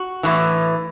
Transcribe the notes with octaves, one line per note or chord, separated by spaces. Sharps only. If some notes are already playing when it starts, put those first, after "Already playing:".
Already playing: F#4
A2 E3